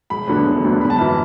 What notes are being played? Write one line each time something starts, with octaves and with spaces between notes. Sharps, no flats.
E1 B5
D2 D3 F#3 B3
E1
D2 D3 F#3 B3
F#1 B5
A5
F#2 E3 B5